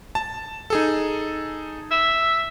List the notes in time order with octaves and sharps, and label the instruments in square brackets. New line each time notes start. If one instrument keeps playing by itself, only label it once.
[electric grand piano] A5
D#4 G#4 A4
[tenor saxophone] E5